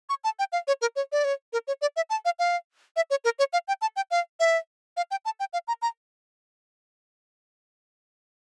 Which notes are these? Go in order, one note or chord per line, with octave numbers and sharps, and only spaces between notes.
C#6
A5
G5
F5
C#5
A#4
C#5
D5
C#5
A#4
C#5
D5
E5
A5
F5
F5
E5
C#5
A#4
C#5
F5
G5
A5
G5
F5
E5
F5
G5
A5
G5
F5
A#5
A#5